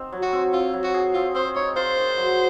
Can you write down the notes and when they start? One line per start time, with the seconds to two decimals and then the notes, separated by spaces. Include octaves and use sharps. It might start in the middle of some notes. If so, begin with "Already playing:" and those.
Already playing: C4 D#4
0.12 F#3
0.22 F#4
0.33 C4
0.53 C4 F4
0.74 F#3
0.84 F#4
0.94 G#4
1.14 C4 F4
1.35 C4 C5
1.56 D#4 C#5
1.76 F4 C5
1.97 D#3
2.17 F#3